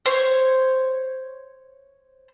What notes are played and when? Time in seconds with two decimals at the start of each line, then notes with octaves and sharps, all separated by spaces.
0.06 C5 C#5